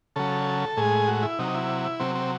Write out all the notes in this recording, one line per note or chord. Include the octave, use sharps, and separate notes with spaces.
C#3 F#3 A4
A2 G#3 G#4
F#4
E4
C3 F#3 D#4
E4
C3 F#3 C4
C4